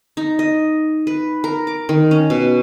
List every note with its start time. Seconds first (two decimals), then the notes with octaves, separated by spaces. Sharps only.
0.17 D#4
0.39 D#5
1.07 B4
1.44 A#4
1.67 D6
1.89 D#3
2.11 C#4
2.30 B2